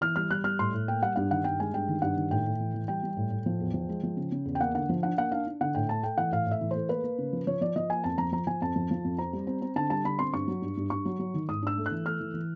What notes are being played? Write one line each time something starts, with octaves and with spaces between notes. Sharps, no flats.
E3 F6
G3 F6
G3 F#6
G3 F6
A2 C6
A2
A#3 G5
G3 F#5
G2 F#5
D#3 F#5
G2 G5
G#3 G#5
G2 G5
D#3
G2 F#5
D#3
A2 G5
A2
E3
E3
G3 G5
G3
A2
A2
F3
E2
F3
G#3
F3
C#3
C#3
E2
G5
A#3 F#5
D3 F#5
F3
D4 F#5
A#3 F#5
D4 F5
D4
D3 F#5
A2 G5
A3 A5
A3 G5
E3 F#5
A2 F5
A2 E5
E3
A3 C5
A#3 B4
A#3
C#3
F3
F3 C#5
F3 D5
F3 D#5
A#3 G#5
F2 A5
F3 A#5
F3 A#5
F3 G#5
F2 A5
F3
F3
F2
C4 A#5
G3
C4
C4
D3 A5
G3 A5
D3 B5
C4 C6
G2 C#6
F#3
G2
G2
G2 C#6
F#3
F#3
D#3
G#2 D#6
D4 E6
A3
F#6
E3
A3 F6
E3
E3